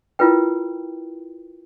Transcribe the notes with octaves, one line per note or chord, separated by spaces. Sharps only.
E4 F4 A#4 B4 G5